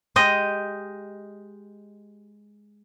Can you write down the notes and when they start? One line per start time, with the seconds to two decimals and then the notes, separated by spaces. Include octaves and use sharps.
0.16 G#3 G4 D#5